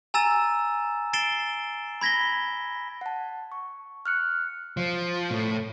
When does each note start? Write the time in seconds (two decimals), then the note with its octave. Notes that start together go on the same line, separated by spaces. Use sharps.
0.14 G#5 A#5 E6 A6 E7
1.13 A6 C7 D7 E7 G7
2.01 B5 G#6 A#6 B6 G7
3.01 F#5 A5
3.52 C#6
4.06 F6 F#6 C#7
4.77 F3
5.31 A2